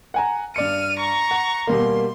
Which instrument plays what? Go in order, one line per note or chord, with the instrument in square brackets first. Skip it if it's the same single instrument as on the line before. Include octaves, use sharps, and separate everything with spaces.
[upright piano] F#5 G#5 A#5
[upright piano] G2 D5 C#7 [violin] F6 D#7
[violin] A#5 C#6
[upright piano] F#5
[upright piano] B2 G3 A#3 [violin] C6